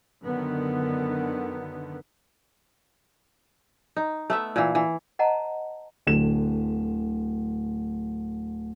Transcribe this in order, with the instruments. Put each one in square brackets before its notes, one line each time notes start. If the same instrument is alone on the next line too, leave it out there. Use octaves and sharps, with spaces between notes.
[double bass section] F#2 D3 D#3 B3
[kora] D#4
A3 B3 E5
A#2 E3
E3
[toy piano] C5 D#5 F#5 A5 A#5
[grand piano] D1 D3 E7